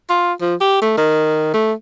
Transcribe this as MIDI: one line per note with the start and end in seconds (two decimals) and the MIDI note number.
0.10 0.33 65
0.41 0.54 53
0.61 0.80 67
0.82 0.95 57
0.98 1.53 51
1.54 1.73 57